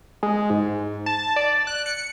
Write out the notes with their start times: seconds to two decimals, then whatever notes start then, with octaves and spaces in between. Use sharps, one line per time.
0.23 G#3
0.50 G#2
1.06 A5
1.36 D5
1.67 F#6
1.86 C#7